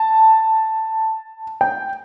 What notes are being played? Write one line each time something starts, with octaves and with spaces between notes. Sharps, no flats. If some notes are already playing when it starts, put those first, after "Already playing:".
Already playing: A5
G5